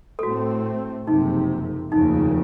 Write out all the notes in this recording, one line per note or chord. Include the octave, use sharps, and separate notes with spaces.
A4
A2 A3 C4 F#4
F#1 F2 C3 D#4
F1 D#2 C#3 D#4